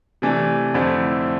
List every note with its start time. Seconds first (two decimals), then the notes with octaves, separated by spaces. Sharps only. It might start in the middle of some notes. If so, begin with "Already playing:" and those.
0.22 C3 E3 A3 D4
0.74 F2 D3 A3 C4 E4